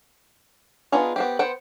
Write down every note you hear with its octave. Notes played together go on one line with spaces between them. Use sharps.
B3 D4 D#4 F4 G#4
B3 C4 G4
B3 C5 F#5 G5